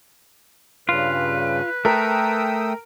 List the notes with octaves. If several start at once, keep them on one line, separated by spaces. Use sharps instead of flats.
G2 C#3 F4 B4
A3 A#4 G5 D#6 E6